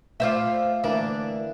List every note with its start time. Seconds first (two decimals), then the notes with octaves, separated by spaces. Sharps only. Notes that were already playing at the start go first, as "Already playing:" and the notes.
0.20 A3 F4 C5 D5 E5
0.84 D2 E3 A#3 D4